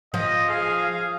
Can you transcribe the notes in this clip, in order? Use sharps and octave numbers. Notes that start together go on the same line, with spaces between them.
F3 D#5
G#4 F5